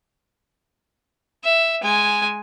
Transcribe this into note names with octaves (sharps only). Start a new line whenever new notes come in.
E5
G#3 G#5